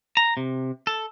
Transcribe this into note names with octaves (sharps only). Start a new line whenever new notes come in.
A#5
C3
A4